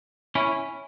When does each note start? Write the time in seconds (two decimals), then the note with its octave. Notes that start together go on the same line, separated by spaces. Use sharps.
0.35 C#4 E4